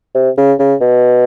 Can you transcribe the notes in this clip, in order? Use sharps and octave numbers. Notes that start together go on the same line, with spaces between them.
C3
C#3
C#3
B2